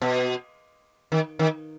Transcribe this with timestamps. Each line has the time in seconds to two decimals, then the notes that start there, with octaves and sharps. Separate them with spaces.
0.01 B2
1.12 D#3
1.39 D#3